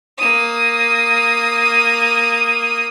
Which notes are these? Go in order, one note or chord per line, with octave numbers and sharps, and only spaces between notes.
A#3 D#6